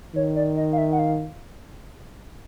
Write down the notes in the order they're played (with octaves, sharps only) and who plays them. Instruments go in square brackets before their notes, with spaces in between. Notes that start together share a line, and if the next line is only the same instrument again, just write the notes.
[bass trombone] D#3 [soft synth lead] C#5
[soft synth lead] D5
D#5
F5
E5
F#5
F5